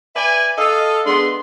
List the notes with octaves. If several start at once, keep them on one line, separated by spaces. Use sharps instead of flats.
B4 D5 E5 G#5
A4 D#5 F5
G#3 B3 D4 G#4 C6